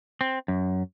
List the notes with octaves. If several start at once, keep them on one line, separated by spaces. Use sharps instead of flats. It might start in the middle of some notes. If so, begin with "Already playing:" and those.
C4
F#2